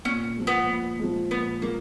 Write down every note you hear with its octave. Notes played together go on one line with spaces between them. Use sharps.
A#2 C#4
F3 G#3
B3
A#2
F3 G#3
A#2 B3
F3 G#3 A#3